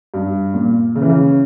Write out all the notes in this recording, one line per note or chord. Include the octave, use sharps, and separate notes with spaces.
G2
A#2
C#3
E3
C#3